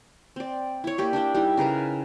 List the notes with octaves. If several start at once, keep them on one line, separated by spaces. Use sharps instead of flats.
C4 D5
E4 C#5
A#3 G4 D5
D4 E4 D5 G5
G3 D#4 E4
C#3 A#4 B4 A#5